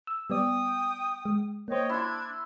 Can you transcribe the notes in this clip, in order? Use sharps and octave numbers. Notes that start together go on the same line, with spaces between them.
E6
G3 B3 D5 G5 D#6
G#3
A#3 C5 C#5 D#5 G5
D4 E4 C6 G#6